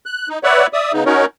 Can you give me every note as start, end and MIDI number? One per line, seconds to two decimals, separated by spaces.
0.06 0.29 90
0.29 0.39 63
0.44 0.67 71
0.44 0.67 73
0.44 0.67 74
0.44 0.67 76
0.44 0.67 78
0.73 0.92 74
0.73 0.92 76
0.73 0.92 87
0.93 1.04 49
0.93 1.04 59
0.93 1.04 63
1.06 1.26 61
1.06 1.26 63
1.06 1.26 66
1.06 1.26 70
1.06 1.26 73